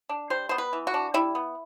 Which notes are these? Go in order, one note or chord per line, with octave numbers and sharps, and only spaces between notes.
D4
G3 C5
B3 C5
B4
E3
F#4
D4
G3 E4
B3